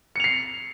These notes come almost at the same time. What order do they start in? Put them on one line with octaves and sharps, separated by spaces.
C#7 F7 C7